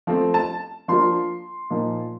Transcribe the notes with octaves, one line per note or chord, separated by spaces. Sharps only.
F3 A3 C4
A5
F3 A#3 D4 F4 C6
A#2 F3 A#3 D#4